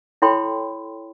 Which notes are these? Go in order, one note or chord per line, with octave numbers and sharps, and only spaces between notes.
E4 A4 C#5 G5 B5 C6